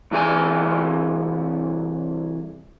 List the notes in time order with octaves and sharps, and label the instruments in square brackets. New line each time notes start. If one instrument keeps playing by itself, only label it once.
[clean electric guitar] C2 E3 G#4 G#5